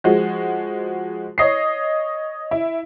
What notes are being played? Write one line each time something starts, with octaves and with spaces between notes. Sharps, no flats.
F3 G#3 F#4
C#5 D#5 C7
E4